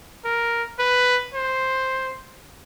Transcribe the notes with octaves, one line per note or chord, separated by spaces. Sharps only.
A#4
B4
C5